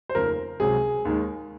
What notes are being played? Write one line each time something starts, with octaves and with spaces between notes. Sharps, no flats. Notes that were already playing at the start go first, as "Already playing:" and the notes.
C5
F1 D#2 C#3 F3 A#4
C#2 C3 F#3 G#4
D#2 D#3 G#3